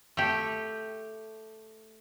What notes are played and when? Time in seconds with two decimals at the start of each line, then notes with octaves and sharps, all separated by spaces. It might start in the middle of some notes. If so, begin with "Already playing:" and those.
0.17 A3 G4